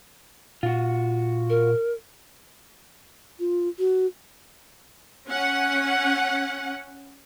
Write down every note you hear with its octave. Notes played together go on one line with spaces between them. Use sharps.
A#2 F4 F#4
A#4
F4
F#4
C#4 F#5